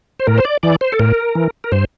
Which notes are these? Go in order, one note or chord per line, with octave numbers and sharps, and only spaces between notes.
C5
A2 A#4
C5
D5
E3 D5
C5
A4
A2 A#4
E3
A#4
G2 C5